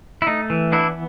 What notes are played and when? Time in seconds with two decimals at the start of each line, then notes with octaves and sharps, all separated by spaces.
0.22 E4
0.27 A3 D#4
0.50 E3
0.72 B3 D4 E4